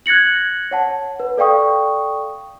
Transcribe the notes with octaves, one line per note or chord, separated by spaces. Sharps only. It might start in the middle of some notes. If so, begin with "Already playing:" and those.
F#6 G#6 A#6 C#7 F#7
C#5 F#5 A5
B4
A4 D5 F5 G5 C#6 D#6